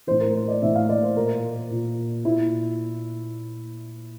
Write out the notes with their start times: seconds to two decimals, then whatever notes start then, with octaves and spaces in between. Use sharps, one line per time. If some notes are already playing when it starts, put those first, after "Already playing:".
0.07 A2 E3 C5
0.21 A#4
0.35 C5
0.48 D5
0.62 A2 E3 E5
0.75 F5
0.89 D5
1.03 C5
1.16 A#2 A#4
1.71 A#2
2.25 A#2 E4